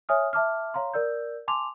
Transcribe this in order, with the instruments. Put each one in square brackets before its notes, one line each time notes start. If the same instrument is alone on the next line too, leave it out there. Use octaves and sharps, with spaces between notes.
[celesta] C#5 E5 G#5 D#6 F6
E5 A5 D6 F6
C#5 F5 A#5 C6
A#4 D5 E6 G6
G#5 A5 C6 D6 F7